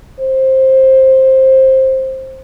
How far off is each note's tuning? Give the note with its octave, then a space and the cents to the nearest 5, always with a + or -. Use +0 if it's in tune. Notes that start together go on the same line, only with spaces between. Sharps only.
C5 +15